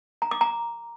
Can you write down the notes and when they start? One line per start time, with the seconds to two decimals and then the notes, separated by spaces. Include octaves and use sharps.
0.22 A#5
0.31 D6
0.41 A#5